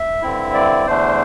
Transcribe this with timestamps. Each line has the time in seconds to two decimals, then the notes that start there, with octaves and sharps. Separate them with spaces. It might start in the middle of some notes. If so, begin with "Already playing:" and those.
Already playing: E5
0.22 G2 D3 C4 E4
0.54 D5
0.86 E2 D3 A3 D4 C5